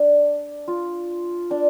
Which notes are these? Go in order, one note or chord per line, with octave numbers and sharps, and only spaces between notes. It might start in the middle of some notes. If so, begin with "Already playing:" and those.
Already playing: D4
F4
D4